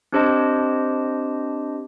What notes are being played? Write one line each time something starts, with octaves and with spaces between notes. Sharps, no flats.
C4 D4 G4 C5 D#5 A5